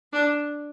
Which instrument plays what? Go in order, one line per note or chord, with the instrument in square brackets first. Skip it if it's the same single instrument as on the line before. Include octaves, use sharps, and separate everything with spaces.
[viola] D4